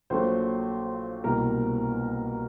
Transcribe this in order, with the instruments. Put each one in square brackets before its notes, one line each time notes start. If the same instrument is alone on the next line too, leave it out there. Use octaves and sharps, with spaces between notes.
[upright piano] A#1 A#2 F#3 A3 C5
C2 B2 G3 A#3 A#4